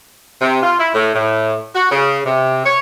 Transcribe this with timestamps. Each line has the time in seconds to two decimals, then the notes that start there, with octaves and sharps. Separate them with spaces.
0.41 C3
0.63 F4
0.78 E4
0.94 A2
1.14 A2
1.74 F#4
1.91 C#3
2.26 C3
2.64 C#5